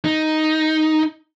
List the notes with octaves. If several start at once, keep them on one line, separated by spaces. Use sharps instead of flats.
D#4